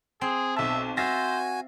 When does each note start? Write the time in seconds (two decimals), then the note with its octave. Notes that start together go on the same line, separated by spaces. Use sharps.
0.21 C4 G#4
0.56 B1 E5 A5
0.97 F#4 C5 E5 F5 G#5 A6 A#6